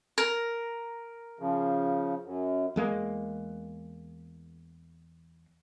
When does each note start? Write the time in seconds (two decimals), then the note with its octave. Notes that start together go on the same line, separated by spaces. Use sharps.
0.18 A#4
1.39 C#3 F3
2.23 F#2
2.76 E2 G#3 A#3